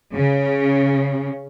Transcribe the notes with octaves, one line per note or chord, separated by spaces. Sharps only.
C#3